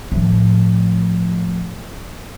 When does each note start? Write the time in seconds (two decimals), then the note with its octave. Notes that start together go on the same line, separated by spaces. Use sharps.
0.12 A2 F3